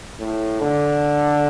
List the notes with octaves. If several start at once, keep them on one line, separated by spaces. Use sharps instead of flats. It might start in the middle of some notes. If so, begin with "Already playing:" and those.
A2
D3